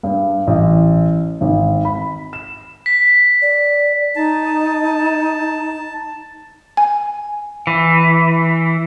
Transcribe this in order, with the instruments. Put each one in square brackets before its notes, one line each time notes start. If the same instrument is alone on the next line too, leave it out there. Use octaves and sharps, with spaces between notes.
[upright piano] G2
A1
G#1
B5
E7
[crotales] B6
[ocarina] D5
[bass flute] D#4 [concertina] A5
[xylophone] G#5
[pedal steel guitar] E3